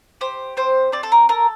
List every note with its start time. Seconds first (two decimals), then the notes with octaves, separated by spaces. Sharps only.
0.21 G4 C5
0.57 C4 C5
0.92 C4 D5
1.03 A4
1.12 A#4
1.29 A4 A#4